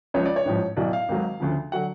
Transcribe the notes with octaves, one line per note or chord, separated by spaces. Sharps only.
C#2 C#3 F3 C#5
D5
C#5
A1 G#2 F3
B1 A2 F#3 D5
F5
G#1 G#2 F#3
D2 C#3 F3
D3 F#3 F#5